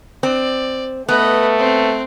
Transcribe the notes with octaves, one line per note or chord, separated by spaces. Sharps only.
C4 D5
A3 B3 B4 D#5
C4